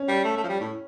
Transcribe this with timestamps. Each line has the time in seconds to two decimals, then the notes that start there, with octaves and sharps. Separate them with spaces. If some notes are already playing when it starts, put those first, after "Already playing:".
Already playing: C#4
0.08 G3
0.24 A3
0.37 A3
0.44 F3
0.49 G3
0.61 A2